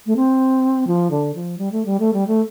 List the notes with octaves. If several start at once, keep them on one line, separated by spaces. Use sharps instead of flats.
A3
C4
F3
D3
F3
G3
A3
G3
A3
G3
A3